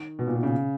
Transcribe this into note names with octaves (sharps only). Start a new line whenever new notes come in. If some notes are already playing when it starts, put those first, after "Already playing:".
Already playing: D#3
B2
A#2
B2
C#3